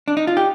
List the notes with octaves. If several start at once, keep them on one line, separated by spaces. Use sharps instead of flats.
D4
D#4
F4
G4